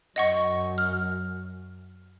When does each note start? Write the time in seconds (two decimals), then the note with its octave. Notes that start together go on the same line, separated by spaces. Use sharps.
0.16 F#2 D#5 F#5 C#6
0.78 F6